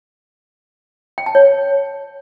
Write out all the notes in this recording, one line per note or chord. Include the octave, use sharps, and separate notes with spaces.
G5
A5
C#5